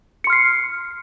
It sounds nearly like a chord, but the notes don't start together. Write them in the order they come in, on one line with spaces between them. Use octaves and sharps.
C#7 C6 F6 C7